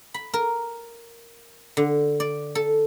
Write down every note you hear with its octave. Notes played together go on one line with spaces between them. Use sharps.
B5
A#4
D3
D5
A4